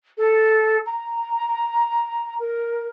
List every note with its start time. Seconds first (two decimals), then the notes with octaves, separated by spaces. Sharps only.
0.18 A4
0.86 A#5
2.39 A#4